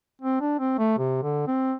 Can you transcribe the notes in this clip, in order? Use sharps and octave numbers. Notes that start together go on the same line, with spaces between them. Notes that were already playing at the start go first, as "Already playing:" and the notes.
C4
D4
C4
A3
C3
D3
C4